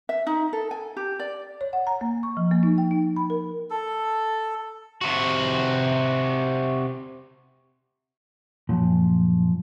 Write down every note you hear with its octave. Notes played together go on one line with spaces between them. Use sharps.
E5
D#4
A4
G#5
G4
D5
C#5
F#5
A#5
A#3
C#6
F3
A#3
D#4
G5
D#4
B5
A#4
A4
C3 F#4
F#2 A#2 F3